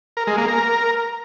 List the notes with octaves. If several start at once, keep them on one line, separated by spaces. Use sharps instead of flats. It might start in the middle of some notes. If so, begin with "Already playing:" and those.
A#4
G#3
A#3
A#4